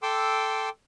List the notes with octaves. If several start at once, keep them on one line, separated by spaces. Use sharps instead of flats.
A4 G5 C6 D6 E6